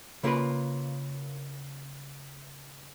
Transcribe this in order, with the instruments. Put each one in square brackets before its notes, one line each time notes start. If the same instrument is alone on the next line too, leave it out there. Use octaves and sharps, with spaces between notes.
[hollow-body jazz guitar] C#3 A#3 F4 G4 A#4 B4